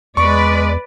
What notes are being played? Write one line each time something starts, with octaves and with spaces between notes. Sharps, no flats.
E2 G#3 B4 D5 C#6